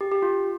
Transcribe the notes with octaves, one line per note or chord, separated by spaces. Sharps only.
G4
G4
F4